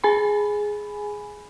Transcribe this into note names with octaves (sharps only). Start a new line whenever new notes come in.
G#4 G#5 B5